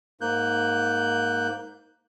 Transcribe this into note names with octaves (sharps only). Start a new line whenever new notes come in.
G#2 A#3 F#6 G6